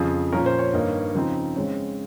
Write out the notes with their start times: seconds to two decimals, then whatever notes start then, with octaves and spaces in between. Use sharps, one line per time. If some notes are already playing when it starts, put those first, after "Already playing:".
Already playing: F2 C#3 F3 G#4
0.33 A#2 F3 A#3 C#4 A#4
0.46 C5
0.59 C#5
0.73 G2 D#3 A#3 D#4
1.15 C#3 F3 C4 D#4
1.56 C#3 G#3 C4 C#5